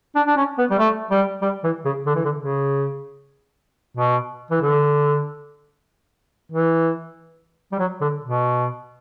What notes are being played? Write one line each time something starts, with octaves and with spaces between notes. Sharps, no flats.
D4
D4
C#4
B3
G3
A3
G3
G3
E3
C#3
D3
E3
D3
C#3
B2
E3
D3
E3
G3
F#3
D3
B2